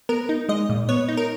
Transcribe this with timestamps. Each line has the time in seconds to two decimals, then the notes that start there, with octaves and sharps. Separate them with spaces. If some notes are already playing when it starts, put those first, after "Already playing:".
0.09 B3 A#4
0.29 D#4
0.49 G#3 D#5
0.69 A#2
0.89 B3 C#5
1.09 D#4
1.17 A#4